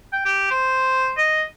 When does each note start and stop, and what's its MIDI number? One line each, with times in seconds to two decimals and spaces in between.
0.13 0.25 79
0.25 0.51 67
0.51 1.12 72
1.17 1.43 75